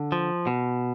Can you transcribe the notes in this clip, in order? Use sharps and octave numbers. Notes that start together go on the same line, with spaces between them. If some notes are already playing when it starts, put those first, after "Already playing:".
Already playing: D3
F3
B2